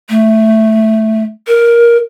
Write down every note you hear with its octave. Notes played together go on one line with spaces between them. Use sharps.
A3
A#4